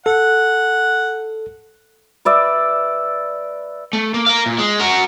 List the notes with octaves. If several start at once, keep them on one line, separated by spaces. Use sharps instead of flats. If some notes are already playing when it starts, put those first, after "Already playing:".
A4 F#5
B4 D5 E5
A3
A#3
A#4 F5
A#2
G#3
F#4 A#4